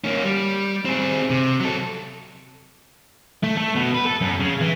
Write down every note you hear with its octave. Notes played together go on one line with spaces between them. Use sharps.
A#3 C#4
G3
C4 G#4
C3
F#3 A4
A3
A3
B2
B4
A4
F#2
C#3
E3